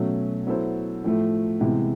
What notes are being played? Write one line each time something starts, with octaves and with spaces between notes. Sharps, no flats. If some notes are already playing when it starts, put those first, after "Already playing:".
Already playing: B2 F#3 A3 C#4
F#3 B3 E4 A4 C5
A2 F3 A3
C3 E3 G#3 B3